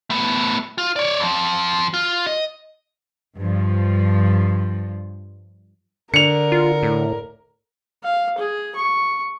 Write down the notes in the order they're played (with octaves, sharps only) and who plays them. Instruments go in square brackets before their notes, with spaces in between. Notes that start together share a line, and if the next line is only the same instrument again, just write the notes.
[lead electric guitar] A3 B3
F4
C#5 D5
F2 F3
F4
D#5
[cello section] G2 F3
[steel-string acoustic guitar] D3 [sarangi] A#4 [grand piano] C#7 F7
[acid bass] F4
A2
[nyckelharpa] F5
G#4
C#6